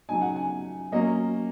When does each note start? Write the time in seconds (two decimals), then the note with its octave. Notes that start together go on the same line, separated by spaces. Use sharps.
0.09 C#3 F#3 D#4 G#5
0.21 F#5
0.36 G#5
0.92 F#3 A#3 C#4 D#5